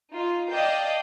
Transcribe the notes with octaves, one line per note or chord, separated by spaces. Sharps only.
D#4 F4
D5 D#5 F5 G5 A5 G6